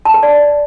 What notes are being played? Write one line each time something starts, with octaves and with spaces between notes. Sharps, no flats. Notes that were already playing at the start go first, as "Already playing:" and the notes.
A5
B4
D5